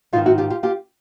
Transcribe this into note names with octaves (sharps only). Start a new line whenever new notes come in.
G#2 D#3 D#4 F4
E4 F#4
F4 G4
F4 G4
F4 G4